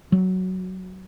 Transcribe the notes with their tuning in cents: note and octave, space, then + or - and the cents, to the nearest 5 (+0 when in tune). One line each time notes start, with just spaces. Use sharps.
F#3 +5